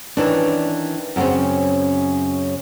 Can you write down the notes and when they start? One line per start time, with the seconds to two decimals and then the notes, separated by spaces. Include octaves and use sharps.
0.17 D#3 E3 C#4 D4
1.16 F#2 C#3 A#3 C4 C#4